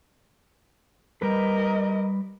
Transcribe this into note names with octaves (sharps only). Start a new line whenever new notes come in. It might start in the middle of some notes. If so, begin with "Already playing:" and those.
G3 A#4 B4 D#5